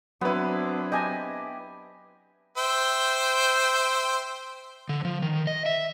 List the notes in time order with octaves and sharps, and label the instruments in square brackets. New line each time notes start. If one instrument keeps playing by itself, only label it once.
[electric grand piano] F#3 B4 [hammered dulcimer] B3 E4 [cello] C4 D4
[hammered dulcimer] G4 [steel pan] D#5 G#5 A5
[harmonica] C5 E5 G5
[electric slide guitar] D3
F3
D#3
D#5
E5